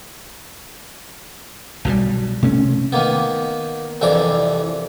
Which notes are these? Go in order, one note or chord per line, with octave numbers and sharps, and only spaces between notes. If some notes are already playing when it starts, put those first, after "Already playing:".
B1 B2 D#3 G3
C3 A3 C#4
D#3 A#3 B3
C2 F2 E3 D4 D6